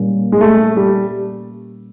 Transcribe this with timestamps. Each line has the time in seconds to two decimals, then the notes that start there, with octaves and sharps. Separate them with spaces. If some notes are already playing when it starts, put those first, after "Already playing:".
Already playing: A#2 G3 A#3 C#4
0.32 G#3
0.41 A3
0.77 G3